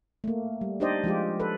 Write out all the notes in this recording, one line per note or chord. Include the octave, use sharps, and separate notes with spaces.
A3 A#3
G3
D4 D#4 G4 C5 D5 D#5
F3 G#3 F4 G4
A4 B4